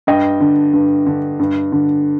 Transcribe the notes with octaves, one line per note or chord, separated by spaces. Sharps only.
G2 D#5 G5
D3
G2
D3
G2
D3